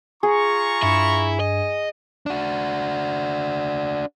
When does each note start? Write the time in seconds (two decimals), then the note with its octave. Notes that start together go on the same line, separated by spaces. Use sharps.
0.23 F4 G#4 A#5 C#6
0.82 G2 E4
1.40 D#5
2.26 D4 F#4